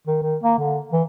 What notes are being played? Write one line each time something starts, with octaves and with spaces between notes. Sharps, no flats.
D#3
D#3
A#3
D3
E3